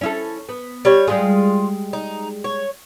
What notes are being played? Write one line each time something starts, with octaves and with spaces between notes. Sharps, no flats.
C#4 E4 A4
B3
G3 C#5
G3 G#3 F4 G#4
D#4
C#5